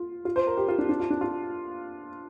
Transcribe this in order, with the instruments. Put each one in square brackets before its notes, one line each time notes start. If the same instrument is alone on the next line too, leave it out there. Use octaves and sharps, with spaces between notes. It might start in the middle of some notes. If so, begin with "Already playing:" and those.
Already playing: [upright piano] F4
F4
C5
A#4
G4
F4
D4
D4
F4
D4
F4